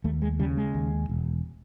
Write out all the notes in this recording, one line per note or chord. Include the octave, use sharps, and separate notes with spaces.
D#2 A3
G#3
C#3 G3
G#3
D#2
E1